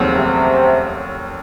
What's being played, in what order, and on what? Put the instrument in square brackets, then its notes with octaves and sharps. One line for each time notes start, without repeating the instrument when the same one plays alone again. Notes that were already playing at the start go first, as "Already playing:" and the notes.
Already playing: [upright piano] F1 D#2 C#3 F#3 C4
[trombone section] C3